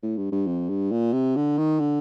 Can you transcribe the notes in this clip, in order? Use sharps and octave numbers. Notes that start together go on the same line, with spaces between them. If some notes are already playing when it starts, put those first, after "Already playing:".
A2
G2
G2
F2
G2
A#2
C3
D3
D#3
D3